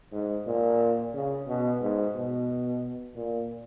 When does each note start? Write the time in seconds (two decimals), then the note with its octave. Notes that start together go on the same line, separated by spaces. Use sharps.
0.12 G#2
0.47 A#2
1.14 C#3
1.48 B2
1.81 G#2
2.15 B2
3.16 A#2